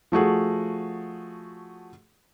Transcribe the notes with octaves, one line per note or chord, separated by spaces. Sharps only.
F3 A3 F#4 G#4